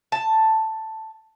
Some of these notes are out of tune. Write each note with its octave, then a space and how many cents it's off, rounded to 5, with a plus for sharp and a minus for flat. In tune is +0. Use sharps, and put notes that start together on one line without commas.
A5 +5